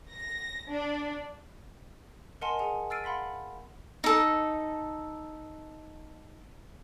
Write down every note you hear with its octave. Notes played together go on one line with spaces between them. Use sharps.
A#6
D4
A#4 D#5 F#5 G#5 A5 C6
G#4 F#5 G#5
E6 F6 A6 C7 D7 D#7
F5 F#5 B5 C6 B6
D#4 A4